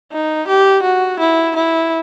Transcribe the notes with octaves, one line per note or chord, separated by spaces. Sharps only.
D#4
G4
F#4
E4
E4